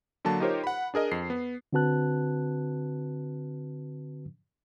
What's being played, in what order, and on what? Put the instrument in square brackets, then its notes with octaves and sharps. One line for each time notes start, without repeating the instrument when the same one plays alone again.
[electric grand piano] D3 F#3 A#3 A5
D#4 F4 G4 A#4 C5 C#5
F#5 B5
D4 G#4 A#4 D#5
F2 C7
B3
[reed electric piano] D3 C4 F#4 B4 A5 F#6